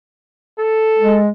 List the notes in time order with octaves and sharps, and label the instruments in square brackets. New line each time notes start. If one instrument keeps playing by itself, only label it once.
[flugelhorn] A4
[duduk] G#3